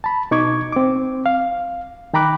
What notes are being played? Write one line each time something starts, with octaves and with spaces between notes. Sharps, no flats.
A5 B5
B2 D#4 C#6 D6 G#6
C4 D6
F5
D#3 G5 A#5 B5 D6 F#6